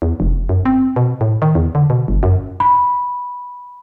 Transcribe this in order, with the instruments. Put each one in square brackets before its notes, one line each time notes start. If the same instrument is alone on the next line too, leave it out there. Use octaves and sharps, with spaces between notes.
[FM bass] E2
F1
F#2
C4
B2
A2
D#3
E2
D3
B2
G1
F#2
[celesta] B5